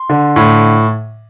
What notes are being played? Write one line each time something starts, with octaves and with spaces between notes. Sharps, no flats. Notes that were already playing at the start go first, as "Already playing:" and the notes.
Already playing: C6
D3
A2